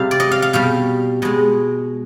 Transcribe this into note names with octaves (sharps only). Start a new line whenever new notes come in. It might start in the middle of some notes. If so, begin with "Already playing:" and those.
Already playing: C3 G3 F5
D5
D#5
F5
F5
B2 G3 F5
B2 G#3 D#5